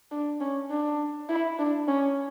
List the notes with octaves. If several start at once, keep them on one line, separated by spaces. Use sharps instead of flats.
D4
C#4
D4
E4
D4
C#4